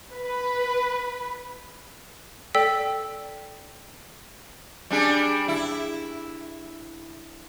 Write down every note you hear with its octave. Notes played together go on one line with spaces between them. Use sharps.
B4
A4 D5 G5 E6 B6
G3 D4 G#4
E4